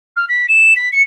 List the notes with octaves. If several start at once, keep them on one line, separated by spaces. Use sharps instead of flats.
F6
B6
E7
B6
C#7